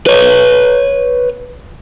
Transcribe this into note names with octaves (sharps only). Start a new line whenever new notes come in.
B4 C#5